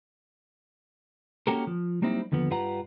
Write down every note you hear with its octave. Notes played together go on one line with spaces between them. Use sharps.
A#3 C#4 F#4 G4 A4 A#4
F3
F#3 G3 A#3 C4 D#4 E4
D#2 D3 F3 B3
G2 G3 F4 B4 F#5 A#5